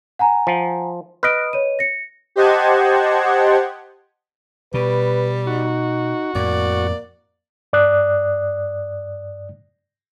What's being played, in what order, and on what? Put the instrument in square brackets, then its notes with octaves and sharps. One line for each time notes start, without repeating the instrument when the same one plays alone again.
[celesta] F#5 G#5 A#5
[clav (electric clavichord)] F3
[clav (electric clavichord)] B4 D#5 [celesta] F6 D7
[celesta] C#5 D#7
A#6 C#7
[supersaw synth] G4 C5 D#5 F#5 A5 G#6
[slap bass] B2 [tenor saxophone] G3 [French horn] B4
[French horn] D#4 [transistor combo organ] F#4
[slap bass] F2 A2 [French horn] A#3 [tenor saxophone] D5
[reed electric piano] G2 D5 D#6 F#6